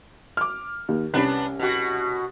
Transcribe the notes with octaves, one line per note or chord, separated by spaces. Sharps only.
D6 F6
D#2
C2 B3 C#4 D4 B4
B2 F#4